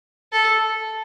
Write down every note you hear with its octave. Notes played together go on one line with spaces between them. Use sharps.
A4